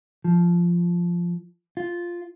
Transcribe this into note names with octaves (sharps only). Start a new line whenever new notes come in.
F3
F4